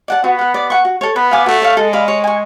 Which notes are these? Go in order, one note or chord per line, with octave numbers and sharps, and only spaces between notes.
D5 F#5 A5
B3 F#4
B4 F#5
D5
F#5 C#6
F#4
A4 C#5
B3 B4
F5 G#5 D6
A3 F#4
C#5 F5
G#3 A4
D5 F5 B5
C#5
G#5 C#6